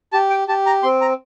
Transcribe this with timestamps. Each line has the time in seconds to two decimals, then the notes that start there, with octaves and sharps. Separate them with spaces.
0.13 G4 A5
0.30 G5
0.48 G4 A5
0.66 A#5
0.83 C4 C6
1.01 A#5